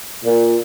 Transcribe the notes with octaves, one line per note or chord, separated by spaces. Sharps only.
A#2